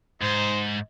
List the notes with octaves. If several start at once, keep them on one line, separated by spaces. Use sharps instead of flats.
G#2 D#4 C5